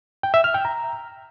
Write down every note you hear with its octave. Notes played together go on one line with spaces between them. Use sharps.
G5
E5
F6
G5
A#5